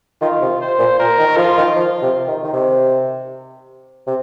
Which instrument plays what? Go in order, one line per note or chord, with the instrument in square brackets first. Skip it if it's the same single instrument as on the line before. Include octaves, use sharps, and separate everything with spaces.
[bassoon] D#3 [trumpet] F4
[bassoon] C3
[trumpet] C5
[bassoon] A#2
[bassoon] A#2 [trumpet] A#4
[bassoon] D#3
[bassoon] F3 [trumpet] F4
[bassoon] D#3
F3
C3
D#3
D#3
C3
C3